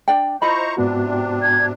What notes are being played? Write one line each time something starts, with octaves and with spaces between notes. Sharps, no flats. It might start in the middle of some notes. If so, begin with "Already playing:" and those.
D4 D5 G5
E4 F4 C5 D#5 A#5 B5 C#6
G#2 C3 B3 D4 F#4
G#6